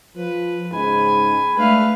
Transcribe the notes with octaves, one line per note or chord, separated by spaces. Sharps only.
F3 B4
G#2 C#3 D#4 G#5 B5
G#3 A3 D4 B4 F5